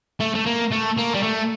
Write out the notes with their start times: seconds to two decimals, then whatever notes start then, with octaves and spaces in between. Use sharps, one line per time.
0.20 A3
0.35 A3
0.46 A#3
0.72 A3
0.98 A#3
1.15 G3
1.23 A3